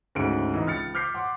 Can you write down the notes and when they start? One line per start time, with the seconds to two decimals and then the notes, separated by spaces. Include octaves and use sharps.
0.15 D2 G#2 C#3 D7
0.54 E3 D#4
0.67 C#2 F6 A6 C#7
0.94 D6 F6 G6 B6 C7
1.14 F#5 C6 D6